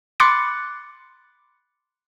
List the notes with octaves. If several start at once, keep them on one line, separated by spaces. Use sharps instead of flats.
B5 C6 D6 F#6 A6 C#7